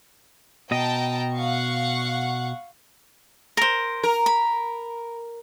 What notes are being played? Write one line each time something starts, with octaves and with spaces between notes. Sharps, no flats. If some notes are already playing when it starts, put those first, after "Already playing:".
B2 D#5 G5 A5 A#5
F5 F#5 C#6
A#4 C5
A#4
B5